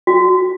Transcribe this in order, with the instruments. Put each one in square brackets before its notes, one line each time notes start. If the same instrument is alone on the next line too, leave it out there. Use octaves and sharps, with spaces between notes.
[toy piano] F#4